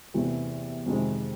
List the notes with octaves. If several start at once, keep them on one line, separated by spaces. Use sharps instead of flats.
E2 C3 E3 A3
F2 C3 D#3 G#3